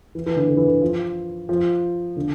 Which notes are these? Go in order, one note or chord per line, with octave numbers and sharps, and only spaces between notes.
E3
E3
D3
D3
E3
D3
F3
F3
D3